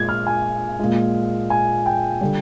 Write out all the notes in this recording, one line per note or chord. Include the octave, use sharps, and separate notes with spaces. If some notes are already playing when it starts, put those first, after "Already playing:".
Already playing: A#2 G#3 G#6
F6
G#5
A#2 G#3
G#5
G5
D3 G3